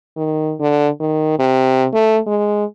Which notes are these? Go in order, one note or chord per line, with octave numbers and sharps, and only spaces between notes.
D#3
D3
D#3
C3
A3
G#3